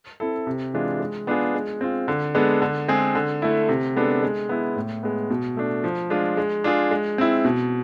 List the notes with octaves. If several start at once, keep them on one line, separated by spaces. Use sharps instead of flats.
C4 E4 A4
C3
E3 G#3 D4 F4
G#3
B3 D4 F4 G#4
G#3
C4 F4
D3
G#3 B3 D4 A4
D3
G#3 C4 G#4
D3
A3 E4
C3
G#3 B3 D4 A4
G#3
B3 E4
A2
G#3 B3
B2
A3 D4
F3
G#3 D4 F4 G#4
G#3
D4 F4 G#4
G#3
C4 E4
B2